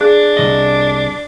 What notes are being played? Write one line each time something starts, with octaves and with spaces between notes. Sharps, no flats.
D4 G#4 F#6
C2 B2 D#5